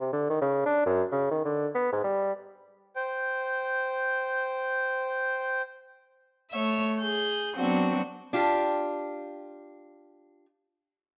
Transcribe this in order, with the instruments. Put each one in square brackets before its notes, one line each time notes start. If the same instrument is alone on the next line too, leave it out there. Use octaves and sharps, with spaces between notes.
[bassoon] C3
D3
D#3
C#3
D4
F#2
C#3
D#3
D3
B3
G#2
G3
[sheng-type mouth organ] C5 G5
[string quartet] A3 C#5 E5
G#4 G6
F#3 B3 C4 D4 F#4
[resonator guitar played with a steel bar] D4 F4 G4